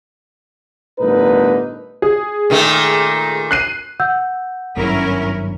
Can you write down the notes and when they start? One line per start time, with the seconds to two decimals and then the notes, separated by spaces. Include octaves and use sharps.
0.99 G1 A2 D3 D#4 A#4 B4
2.02 G#4
2.50 A#2 D#3 A3
3.51 F#6 C7 D#7
4.00 F#5 E6 G6
4.77 G#1 G2 F#3 C#4 E4 A#4